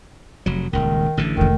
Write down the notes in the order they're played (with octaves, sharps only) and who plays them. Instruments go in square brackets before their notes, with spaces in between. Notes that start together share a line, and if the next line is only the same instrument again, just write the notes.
[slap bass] F1 F#3
[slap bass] D#1 C#2 [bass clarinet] D#3
[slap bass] A1 D3 E3
[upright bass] F1 A3 [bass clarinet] D#3